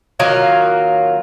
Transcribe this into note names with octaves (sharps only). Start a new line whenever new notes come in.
D#3 F#3 A#3 F4